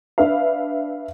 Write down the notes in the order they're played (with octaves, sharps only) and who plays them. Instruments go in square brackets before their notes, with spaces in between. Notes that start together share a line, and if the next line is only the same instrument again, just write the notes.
[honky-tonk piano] D4 B4 E5 F5